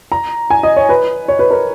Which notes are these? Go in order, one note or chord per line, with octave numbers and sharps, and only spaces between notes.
A#5
G#5
D#5
C#5
B4
C#5
B4
A#4